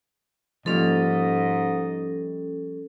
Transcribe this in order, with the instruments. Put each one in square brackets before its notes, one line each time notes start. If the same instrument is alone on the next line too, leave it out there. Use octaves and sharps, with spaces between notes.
[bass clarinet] G#2 [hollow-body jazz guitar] F3 G3 A#3 [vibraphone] C#4 A4 [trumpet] D#5